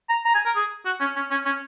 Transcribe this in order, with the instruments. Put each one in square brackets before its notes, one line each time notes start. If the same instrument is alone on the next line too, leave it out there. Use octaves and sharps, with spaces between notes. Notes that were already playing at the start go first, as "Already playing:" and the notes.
[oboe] A#5
A#5
G#5
A#4
G#4
F#4
C#4
C#4
C#4
C#4